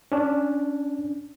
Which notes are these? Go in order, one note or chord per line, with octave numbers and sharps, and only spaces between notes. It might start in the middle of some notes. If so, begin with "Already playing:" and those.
C#4 D4